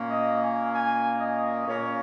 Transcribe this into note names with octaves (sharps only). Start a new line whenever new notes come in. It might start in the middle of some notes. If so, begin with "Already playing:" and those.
Already playing: A#2 A#3 C#4
D#5
G#5
G#5
D#5
A#2 A#3 C#4 C#5